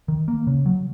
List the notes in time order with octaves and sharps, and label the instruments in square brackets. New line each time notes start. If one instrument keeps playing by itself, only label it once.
[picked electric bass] D#3
A#3
C#3
F#3